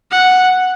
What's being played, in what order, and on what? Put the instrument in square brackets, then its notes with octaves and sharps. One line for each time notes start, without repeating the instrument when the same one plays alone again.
[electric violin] F#5